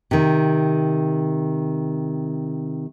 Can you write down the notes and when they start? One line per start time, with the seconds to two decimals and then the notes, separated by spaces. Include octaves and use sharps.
0.11 C3 D#3